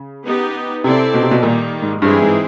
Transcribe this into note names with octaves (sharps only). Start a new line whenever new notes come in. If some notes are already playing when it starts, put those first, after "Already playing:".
Already playing: C#3
B3 D#4 G4 B4
C3 C4 E4 A4 D5
B2
C3
B2
A#2 D#3 G3 A#3
G#2
G2 E3 G#3 C4 E4 G#4
G#2